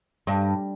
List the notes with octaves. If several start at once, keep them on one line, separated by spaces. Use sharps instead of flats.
G2